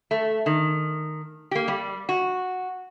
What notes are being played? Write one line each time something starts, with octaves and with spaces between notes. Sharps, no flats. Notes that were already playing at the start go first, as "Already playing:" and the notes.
A3
D#3
A#3 G4
G3
F#4